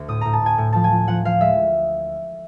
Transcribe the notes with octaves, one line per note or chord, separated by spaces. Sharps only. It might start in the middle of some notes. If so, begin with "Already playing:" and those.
Already playing: D2
A2 D#6
A2 A#5
A5
A2 G#5
A2
F3 A5
G#5
F3
F3 F#5
F3 F5
G#3 E5